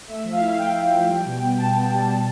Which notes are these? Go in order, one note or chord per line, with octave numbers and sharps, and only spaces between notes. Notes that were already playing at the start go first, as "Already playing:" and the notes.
A3 E5
F3
F5
E4 E5
F5
A3 G5
E4
F3
G3
B2
B3
B2 A5
B3
G3
B2